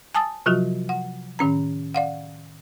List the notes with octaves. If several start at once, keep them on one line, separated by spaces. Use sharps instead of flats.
G#5 A5 D#6 E6 A6
C3 F3 F#3 F4 F#4
F#5
A2 D#3 C#4 A#5
D5 F5 F#5